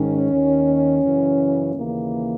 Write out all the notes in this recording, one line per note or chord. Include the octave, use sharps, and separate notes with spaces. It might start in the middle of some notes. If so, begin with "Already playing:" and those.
Already playing: G#2 D#3 C#4
D#2 D#3
F#2 C#3 E3
D#2 C#3 E3 A#3